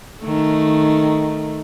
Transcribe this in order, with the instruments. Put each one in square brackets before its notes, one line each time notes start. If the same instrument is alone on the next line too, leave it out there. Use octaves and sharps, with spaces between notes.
[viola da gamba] D#3 A3